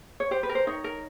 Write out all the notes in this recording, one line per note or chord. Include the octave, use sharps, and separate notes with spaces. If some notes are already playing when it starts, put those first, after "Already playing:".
C#5
G4 C5
B4
A#4
C5
D#4 C#5
A#4